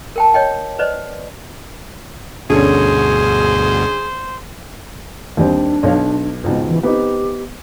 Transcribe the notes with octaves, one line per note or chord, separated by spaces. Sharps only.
A#4 G5 A5
C#5 D#5 G5
B4 C5 D5 D#5
D2 G2 B2 D3 C#4 G#4 C5
D#2 G3 C4 D4
B1 C#5 F5
C#2 G#2 B2
E3
B3 C4 D#4 G4